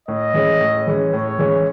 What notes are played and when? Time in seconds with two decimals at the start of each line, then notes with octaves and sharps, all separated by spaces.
0.08 A2 D#5
0.34 E3 G#3 C#4
0.61 A2
0.87 E3 G#3 C#4
1.13 A2 C#5
1.39 E3 G#3 C#4